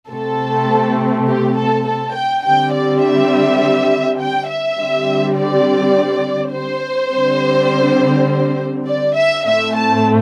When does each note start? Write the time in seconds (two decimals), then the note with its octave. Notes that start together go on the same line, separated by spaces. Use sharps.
0.10 C3 A3 C4 A4
1.28 G4
1.57 A4
1.86 A4
2.15 G5
2.44 D3 G3 C4 G5
2.73 D5
3.03 E5
4.20 G5
4.49 E5
4.78 D3 G3 C4
5.36 D5
6.53 C5
7.11 D3 G3 C4
8.87 D5
9.15 E5
9.45 A2 A3 C4 E5
9.75 A5